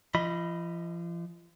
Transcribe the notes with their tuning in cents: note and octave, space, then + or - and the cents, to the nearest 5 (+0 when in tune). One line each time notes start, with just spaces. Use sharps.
F3 -40 D#5 +0 B5 +0